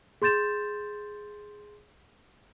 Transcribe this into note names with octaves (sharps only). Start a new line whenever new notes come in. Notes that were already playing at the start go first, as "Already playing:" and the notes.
G#4 C6 G6 A6 E7